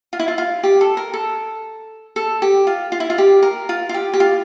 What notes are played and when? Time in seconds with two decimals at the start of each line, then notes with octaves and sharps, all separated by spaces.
0.13 F4
0.19 E4
0.28 F4
0.38 F4
0.63 G4
0.81 A4
0.97 A#4
1.14 A4
2.16 A4
2.42 G4
2.67 F4
2.92 F4
3.00 E4
3.10 F4
3.18 G4
3.43 A#4
3.69 F4
3.89 F4
3.94 G4
4.14 G4
4.20 F4